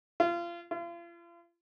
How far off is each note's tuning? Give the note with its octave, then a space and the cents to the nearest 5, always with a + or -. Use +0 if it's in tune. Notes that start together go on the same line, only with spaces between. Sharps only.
F4 -30
F4 -40